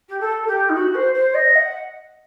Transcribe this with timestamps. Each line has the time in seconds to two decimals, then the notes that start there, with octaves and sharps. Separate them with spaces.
0.08 G4
0.20 A4
0.47 G4
0.69 D#4
0.74 F#4
0.94 C5
1.14 C5
1.34 D#5
1.55 F#5